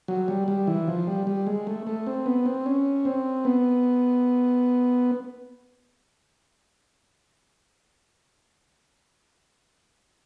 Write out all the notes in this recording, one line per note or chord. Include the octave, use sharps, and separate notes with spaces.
F#3
G3
G3
E3
F3
G3
G3
G#3
A3
A3
C4
B3
C4
C#4
C4
B3